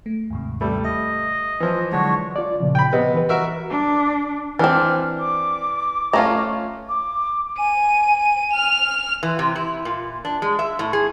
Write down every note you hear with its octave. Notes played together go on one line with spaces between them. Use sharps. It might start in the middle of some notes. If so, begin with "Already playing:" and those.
A3
D#2 G#2 C3
G3 A3 E4
D#5 E5
E3 F3
D3 F#3 G#3 D4 F#4 C#5
F4 D5
A#2 C#3 F3
G5 B5
C3 B3 B4 D#5
E3 B4
F#4 A#4 E5
D4
E3 C4 D4 F6
D6
A3 C#4 F4 F5 A#5
D6
G#5 D#7
F6 F7
E3
C3
E4
A#2
D4
G#3
E5
A2
G#4